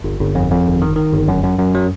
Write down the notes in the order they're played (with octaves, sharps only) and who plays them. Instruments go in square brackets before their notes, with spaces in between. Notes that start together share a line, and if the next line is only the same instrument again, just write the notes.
[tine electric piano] G1
G1
F2
F2
G1
D#3
D#3
G1
F#2
F#2
F#2
F#3